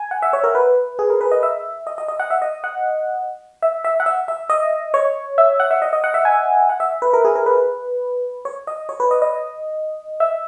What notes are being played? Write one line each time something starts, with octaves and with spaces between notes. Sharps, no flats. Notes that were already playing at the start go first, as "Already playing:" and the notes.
Already playing: G#5
F#5
E5
C#5
A#4
B4
G#4
A#4
B4
D#5
E5
D#5
D#5
D#5
F#5
E5
D#5
F#5
E5
E5
F#5
E5
E5
D#5
C#5
E5
F#5
E5
D#5
D#5
F#5
E5
G#5
F#5
E5
B4
A#4
G#4
A#4
B4
C#5
D#5
C#5
B4
D#5
D#5
E5